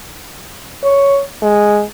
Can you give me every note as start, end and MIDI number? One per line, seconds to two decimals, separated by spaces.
0.83 1.21 73
1.42 1.83 56